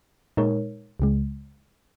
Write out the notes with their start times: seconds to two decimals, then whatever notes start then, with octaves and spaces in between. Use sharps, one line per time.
0.37 A#2 G#3 D#4 A#4 C#5
1.00 C#2 C#3 G#3